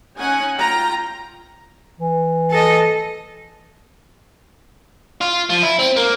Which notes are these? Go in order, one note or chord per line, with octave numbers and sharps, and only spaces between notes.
C#4 D#4 F#5 G#5
F4 G5 A#5
E3
A4 D#5
F4
F3
E4
C4
A#3